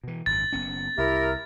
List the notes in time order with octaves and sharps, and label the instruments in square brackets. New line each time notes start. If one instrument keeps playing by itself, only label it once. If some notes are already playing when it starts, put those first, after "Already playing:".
[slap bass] B2 E3
[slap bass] G#1 F#2 [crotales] A6
[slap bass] F#1 B3 C#4
[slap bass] C2 [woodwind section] E4 G4 A#4